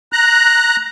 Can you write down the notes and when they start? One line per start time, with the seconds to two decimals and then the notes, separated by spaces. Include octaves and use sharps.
0.13 A#5 F#6